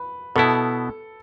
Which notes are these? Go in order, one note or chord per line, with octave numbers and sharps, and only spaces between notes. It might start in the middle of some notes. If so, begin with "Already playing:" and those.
Already playing: B4
B2 B3 E4 A4